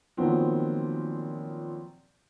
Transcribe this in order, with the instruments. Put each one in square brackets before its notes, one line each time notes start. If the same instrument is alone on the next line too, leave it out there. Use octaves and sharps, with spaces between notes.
[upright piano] A#2 D#3 F3 F#3 B3 C4